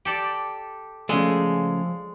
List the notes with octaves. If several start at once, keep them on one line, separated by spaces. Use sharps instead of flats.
G4 A4 D5
C#3 F3 G#3 A3 D5 F5